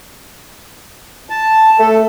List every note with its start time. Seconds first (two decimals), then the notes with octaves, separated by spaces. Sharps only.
1.30 A5
1.79 A3 A4